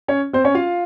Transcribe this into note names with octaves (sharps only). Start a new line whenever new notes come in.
C#4 C#5
C4 C5
C#4 C#5
F4 F5